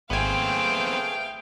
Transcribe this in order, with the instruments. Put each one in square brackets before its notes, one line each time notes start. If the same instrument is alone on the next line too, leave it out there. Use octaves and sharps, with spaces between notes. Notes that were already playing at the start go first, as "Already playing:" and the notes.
[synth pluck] G#1 G#5 [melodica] A3 G#4 [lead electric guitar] B3 C4 [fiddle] F5 G5